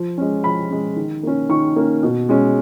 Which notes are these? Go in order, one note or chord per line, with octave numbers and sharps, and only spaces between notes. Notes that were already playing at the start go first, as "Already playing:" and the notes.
Already playing: F3
G#3 C#4
F3 B5
G#3 C#4
D#3
A#3 C#4
D#3 C#6
A#3 C#4
B2
G#3 C#4